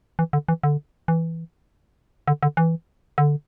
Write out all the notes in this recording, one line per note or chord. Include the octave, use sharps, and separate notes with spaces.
E3
D3
E3
D3
E3
D3
D3
E3
D3